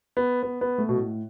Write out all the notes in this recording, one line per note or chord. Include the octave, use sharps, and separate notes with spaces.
B3
B3
B3
A3
B2
A2